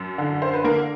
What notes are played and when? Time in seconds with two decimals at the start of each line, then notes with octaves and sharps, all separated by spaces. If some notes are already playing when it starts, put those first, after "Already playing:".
Already playing: F#2
0.18 D3
0.42 C5
0.54 B4
0.64 D3 A#3 A#4